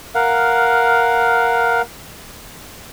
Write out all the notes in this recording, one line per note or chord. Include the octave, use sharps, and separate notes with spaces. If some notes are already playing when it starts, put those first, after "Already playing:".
A#4 F5 F#5